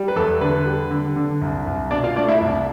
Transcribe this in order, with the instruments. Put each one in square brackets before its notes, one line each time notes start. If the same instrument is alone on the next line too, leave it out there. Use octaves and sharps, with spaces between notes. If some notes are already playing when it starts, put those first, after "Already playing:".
Already playing: [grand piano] G3
B4
E2 A4
D3 B4
G3
D3
D3
C2
C2
B2 D4 D5
F4 F5
A3 D4 D5
E4 E5
C2